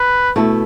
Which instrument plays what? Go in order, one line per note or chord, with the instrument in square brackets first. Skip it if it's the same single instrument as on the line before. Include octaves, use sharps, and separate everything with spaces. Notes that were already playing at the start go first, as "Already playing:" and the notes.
Already playing: [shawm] B4
[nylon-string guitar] B2 A3 E4 A4